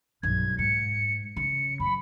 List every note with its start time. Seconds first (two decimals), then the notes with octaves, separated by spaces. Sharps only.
0.23 B1 G2 G#6
0.59 G#2 C#7
1.37 C#3 C#7
1.80 F#2 B5